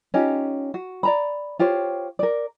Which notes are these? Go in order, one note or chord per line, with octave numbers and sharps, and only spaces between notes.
C#4 D#4 F4 G4
F#4
D5 A#5 B5
F4 G4 C5 C#5
A#4 D5